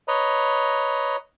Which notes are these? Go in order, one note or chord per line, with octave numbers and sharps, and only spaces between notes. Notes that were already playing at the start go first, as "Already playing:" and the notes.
B4 C#5 D#5 A#5